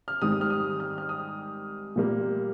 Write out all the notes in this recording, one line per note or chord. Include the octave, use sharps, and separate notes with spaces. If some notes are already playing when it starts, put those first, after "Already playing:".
F6
G#2 D#3 G3 C4 D#6
F6
D#6
F6
F6
D#6
A#2 G3 A#3